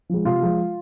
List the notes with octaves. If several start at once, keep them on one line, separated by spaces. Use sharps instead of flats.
F3 G#3
C3 F4
F3 G#3